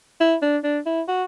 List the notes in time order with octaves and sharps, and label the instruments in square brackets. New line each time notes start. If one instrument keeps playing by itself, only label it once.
[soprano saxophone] E4
D4
D4
E4
F#4